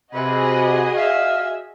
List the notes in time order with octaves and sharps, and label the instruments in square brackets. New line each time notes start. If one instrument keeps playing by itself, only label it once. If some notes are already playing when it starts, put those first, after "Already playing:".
[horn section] C3 [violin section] F#4 G#4 D#5 [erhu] B4
[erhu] E5 [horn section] F5